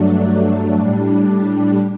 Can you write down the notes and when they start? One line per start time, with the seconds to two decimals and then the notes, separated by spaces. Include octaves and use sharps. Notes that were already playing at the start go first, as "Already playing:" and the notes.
Already playing: G2 F#3 A3 D4
0.76 A2 G3 D4